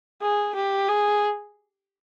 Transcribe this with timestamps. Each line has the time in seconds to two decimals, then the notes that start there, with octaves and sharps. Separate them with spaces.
0.22 G#4
0.55 G4
0.89 G#4